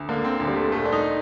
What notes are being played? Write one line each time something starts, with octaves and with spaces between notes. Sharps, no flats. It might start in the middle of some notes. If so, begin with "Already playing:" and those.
Already playing: D2
D3 A#3
C4
D2
G3
A3
A#2 A3
D4
D#4